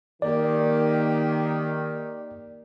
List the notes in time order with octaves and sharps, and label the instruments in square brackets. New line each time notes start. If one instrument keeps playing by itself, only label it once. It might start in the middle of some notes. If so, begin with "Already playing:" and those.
[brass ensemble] D#3 [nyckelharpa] A#3 G4 [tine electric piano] D5